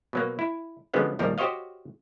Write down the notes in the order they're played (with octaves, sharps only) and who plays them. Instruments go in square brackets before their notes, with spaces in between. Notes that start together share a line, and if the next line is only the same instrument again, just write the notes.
[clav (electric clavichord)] B2 F#3 A#3
E4
D3 F3 F#3 G#3 B3 C#4
A#1 D#2 F3 G3 A#4
F#4 G4 C5 C#5 D#5 F5